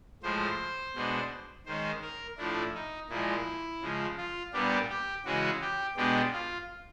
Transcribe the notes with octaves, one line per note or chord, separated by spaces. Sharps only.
A2 F3 G#3 C5
B2 G#3 B3 D4
D#3 G#3 C#4 C5
A#4
A2 F3 A3 D4 E4
D#4
A#2 F3 G#3 E4
C#3 F3 G#3
F4
A#2 G3 B3 D4 G4
G4
C#3 E3 G#3 C#4 F#4
G4
B2 G#3 B3 D4 G4
F4